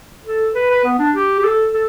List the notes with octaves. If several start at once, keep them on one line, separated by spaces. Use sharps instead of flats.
A4
B4
B4
B3
D4
G4
G4
A4
A4